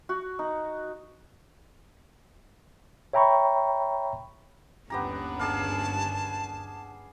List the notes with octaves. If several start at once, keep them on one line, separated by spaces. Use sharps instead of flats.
F#4
D#4
C#5 E5 G5 A#5 B5 C#6
G1 D#2 B3 C#4 D4 G4 B4 A#5
G#4 D5 F5 A5